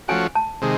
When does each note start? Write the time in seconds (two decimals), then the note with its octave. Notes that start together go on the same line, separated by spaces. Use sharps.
0.08 F3 A3 C#4 F#4 G#5
0.35 A5
0.62 C3 D#3 G#3